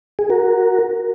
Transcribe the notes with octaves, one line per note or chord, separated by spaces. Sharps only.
G#4
F#4 A#4